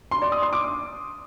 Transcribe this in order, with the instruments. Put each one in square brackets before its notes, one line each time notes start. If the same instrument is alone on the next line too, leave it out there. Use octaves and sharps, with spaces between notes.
[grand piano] C6
D5
D#6
C6
D6